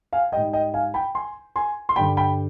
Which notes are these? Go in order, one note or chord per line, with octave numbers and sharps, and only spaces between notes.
F5 G#5
G#2 G3 D#5 G5
D#5 G5
F5 G#5
G5 B5
G#5 C6
G#5 C6
C6
G2 D3 G3 G5 B5
G5 B5